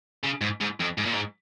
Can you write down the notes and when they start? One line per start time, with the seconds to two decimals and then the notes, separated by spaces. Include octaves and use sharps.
0.24 C#3
0.41 G#2
0.61 G#2
0.80 F2
0.98 G#2
1.05 A#2
1.14 G#2